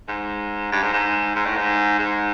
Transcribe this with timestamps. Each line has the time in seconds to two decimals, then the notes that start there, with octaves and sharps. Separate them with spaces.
0.08 G#2
0.72 G2
0.82 G#2
0.93 G#2
1.35 G#2
1.46 A2
1.57 G#2
1.99 G#2